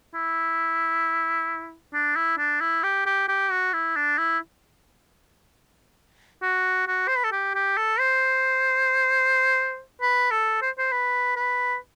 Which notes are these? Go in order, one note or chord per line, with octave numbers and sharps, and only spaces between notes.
E4
D4
E4
D4
E4
G4
G4
G4
F#4
E4
D4
E4
F#4
F#4
C5
B4
A4
G4
G4
A4
C5
B4
A4
C5
C5
B4
B4